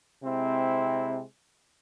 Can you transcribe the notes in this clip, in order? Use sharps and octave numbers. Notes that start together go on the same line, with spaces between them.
C3 G#3 C4 E4